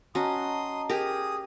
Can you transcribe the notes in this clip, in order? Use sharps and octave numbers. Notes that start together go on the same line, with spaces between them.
C#4 F#4 D#5 A5 A#5 C6 D#6
G4 G#4 A#4 D#6